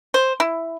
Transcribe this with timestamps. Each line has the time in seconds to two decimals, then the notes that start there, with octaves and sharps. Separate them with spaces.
0.14 C5
0.40 E4